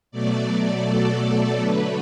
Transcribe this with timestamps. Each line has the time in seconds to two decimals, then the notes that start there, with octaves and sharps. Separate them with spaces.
0.11 B2 F#3 A3 D5
0.85 A4
1.58 D3 F#3 A3 B4